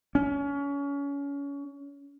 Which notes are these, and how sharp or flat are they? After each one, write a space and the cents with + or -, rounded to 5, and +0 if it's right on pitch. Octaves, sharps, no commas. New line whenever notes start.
C#4 +30